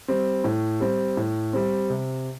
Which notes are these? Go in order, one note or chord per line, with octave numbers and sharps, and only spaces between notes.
G3 C4
A2
G3 C4
A2
G3 C4
C3